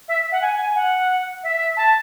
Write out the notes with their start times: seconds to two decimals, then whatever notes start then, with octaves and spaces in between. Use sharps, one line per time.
0.08 E5
0.32 F#5
0.42 G#5
0.74 F#5
1.43 E5
1.77 A5